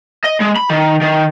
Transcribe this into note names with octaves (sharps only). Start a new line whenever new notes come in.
D#5
G#3
B5
D#3
D#3